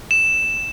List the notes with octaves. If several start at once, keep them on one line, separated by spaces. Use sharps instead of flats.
E7